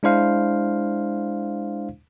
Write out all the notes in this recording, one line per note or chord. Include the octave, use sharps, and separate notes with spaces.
G#3 D4 E4 C5 F5